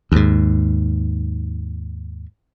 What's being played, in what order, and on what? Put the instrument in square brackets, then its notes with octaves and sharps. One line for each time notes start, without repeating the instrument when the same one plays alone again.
[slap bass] D#2 G#2